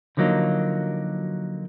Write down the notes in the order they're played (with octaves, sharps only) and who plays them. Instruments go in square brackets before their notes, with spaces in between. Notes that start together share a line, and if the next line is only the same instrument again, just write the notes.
[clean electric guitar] D3 F3 F#3 A#3 D#4